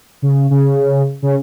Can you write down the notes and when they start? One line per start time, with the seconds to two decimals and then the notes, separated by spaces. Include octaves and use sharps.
0.22 C#3
0.51 C#3
1.22 C#3